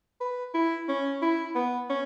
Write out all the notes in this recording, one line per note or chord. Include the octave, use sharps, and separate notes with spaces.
B4
E4
C#4
E4
B3
C#4